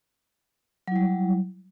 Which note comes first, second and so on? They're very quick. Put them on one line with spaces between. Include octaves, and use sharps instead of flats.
F#3 E4 G3